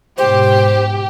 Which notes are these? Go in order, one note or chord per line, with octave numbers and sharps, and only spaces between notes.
G#2 B2 G4 C5